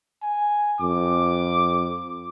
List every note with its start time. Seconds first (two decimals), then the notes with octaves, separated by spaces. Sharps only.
0.23 G#5
0.81 F2 D6